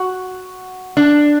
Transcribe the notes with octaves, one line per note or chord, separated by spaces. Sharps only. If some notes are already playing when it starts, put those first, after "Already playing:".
Already playing: F#4
D4